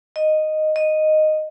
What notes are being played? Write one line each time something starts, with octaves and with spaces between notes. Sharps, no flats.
D#5
D#5